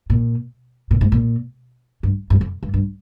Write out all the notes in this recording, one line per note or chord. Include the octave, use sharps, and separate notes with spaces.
A#2
A#2
G#2
A#2
G2
G2
F2
G2
G2